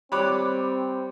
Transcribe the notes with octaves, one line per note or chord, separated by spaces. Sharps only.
G3 C4 C#5 B5 D6 F#6